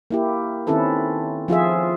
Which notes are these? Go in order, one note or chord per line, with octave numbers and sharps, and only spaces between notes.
A#3 E4 G4
D#3 C4 C#4 E4 A4 B4
F3 F4 G#4 E5